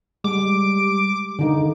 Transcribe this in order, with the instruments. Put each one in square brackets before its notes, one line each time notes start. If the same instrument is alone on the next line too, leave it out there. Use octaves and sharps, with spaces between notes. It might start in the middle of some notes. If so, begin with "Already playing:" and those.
[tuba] G3 [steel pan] G#3 [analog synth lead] D6
[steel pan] D3 D#4 [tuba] D#3